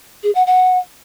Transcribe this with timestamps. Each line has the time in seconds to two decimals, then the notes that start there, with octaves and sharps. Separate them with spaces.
0.23 G#4
0.35 F#5
0.47 F#5